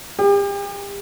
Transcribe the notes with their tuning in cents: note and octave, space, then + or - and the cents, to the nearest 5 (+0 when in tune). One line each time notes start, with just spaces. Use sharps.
G4 +40